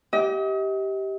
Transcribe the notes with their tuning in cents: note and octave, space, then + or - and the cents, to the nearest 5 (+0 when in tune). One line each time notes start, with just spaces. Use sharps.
G4 -10 D#5 +40